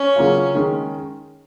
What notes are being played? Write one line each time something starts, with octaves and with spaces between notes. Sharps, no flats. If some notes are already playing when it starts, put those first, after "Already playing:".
Already playing: C#4
C#3 F#3 A#3 F4
D#3 G#3 C#4